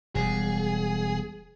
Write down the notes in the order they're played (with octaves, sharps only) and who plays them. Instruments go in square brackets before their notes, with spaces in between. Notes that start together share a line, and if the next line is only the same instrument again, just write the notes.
[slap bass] E1 G3 [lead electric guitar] G#4